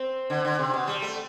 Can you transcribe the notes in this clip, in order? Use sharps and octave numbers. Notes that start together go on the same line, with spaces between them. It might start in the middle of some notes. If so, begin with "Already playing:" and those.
Already playing: C4
D3
D3
C3
B2
G3
A3